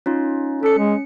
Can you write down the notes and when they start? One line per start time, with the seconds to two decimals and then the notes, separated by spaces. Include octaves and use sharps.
0.06 C#4 D#4 F4
0.63 C#4 A4 C#7
0.78 G#3